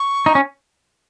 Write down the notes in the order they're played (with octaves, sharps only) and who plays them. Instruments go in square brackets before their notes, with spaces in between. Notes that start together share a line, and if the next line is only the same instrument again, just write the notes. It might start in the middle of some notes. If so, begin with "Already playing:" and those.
Already playing: [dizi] C#6
[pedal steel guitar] D#4
C#4